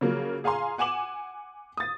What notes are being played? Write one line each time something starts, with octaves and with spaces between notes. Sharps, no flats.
C#3 F3 F#3 A#3
G#4 F5 G#5 A#5 C6
F#5 G#5 D6 E7 F#7
D#6 A6